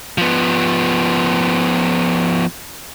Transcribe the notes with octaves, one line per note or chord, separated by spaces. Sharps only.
F3 B3